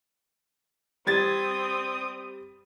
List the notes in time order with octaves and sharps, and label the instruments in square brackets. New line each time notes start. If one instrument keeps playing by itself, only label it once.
[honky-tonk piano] G3 G#6 A6 [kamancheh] C4 D#6